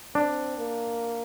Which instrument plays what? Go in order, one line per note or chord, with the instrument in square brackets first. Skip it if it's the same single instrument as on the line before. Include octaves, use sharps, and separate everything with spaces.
[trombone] C4 [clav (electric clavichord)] D4
[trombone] A#3